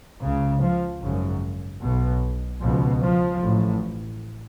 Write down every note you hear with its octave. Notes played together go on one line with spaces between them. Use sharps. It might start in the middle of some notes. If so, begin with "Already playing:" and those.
C#2 C#3
F3
G#1 F#2 C#3
B1 B2
C#2 B2 F3
F3
A1 A2